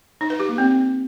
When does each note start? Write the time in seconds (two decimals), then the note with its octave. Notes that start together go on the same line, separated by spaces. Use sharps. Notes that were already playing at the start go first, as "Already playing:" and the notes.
0.21 D#4
0.30 B4
0.40 G4
0.49 A#3
0.58 C4